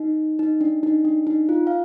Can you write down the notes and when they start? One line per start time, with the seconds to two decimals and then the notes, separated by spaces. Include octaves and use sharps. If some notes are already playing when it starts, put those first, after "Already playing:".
Already playing: D#4
0.39 D#4
0.61 D4
0.83 D#4
1.05 D4
1.27 D#4
1.49 F4
1.67 F5